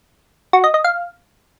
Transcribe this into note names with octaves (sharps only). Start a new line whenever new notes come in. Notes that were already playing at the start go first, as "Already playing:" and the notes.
F#4
D#5
D#5
F5